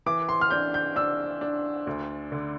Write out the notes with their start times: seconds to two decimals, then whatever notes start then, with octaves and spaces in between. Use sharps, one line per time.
0.06 E3 D6
0.29 C6
0.41 F6
0.50 D4 G6
0.74 G6
0.96 D4 E6
1.41 D4
1.87 D2
2.32 D3